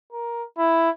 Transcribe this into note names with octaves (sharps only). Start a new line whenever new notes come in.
A#4
E4